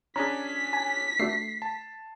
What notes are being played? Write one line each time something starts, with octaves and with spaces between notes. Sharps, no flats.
C#4 D4 G#4 A#5 B6
G#5
A3 D4 F#4 C7
A5